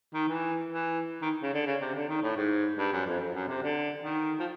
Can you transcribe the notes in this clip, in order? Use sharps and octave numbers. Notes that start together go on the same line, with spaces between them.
D#3
E3
E3
D#3
C#3
D3
C#3
C3
D3
D#3
A2
G#2
G2
F#2
F2
F2
F#2
C3
D3
D#3
F3